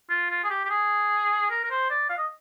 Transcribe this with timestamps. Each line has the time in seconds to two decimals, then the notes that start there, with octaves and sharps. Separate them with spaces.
0.10 F4
0.30 F4
0.44 G#4
0.50 G4
0.65 G4
0.70 G#4
1.50 A#4
1.64 A#4
1.70 C5
1.90 D5
2.10 F5
2.18 D#5